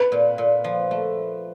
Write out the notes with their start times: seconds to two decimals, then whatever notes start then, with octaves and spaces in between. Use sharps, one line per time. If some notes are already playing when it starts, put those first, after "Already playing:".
Already playing: B4
0.12 A#2
0.38 A#2
0.64 F3
0.91 A3